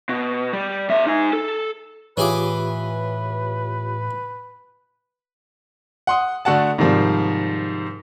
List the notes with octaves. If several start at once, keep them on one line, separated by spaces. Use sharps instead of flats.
B2
G3
B2 E5
D#4 G#5
A4
A2 E3 F4 G4 G#4 B4 C#5 D6
F#5 C6 D#6
D3 A3 F#4 F#5 A5
G#2 C3 D#3 F3 G3